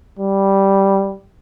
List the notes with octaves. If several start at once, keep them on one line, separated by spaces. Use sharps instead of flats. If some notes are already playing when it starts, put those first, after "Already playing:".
G3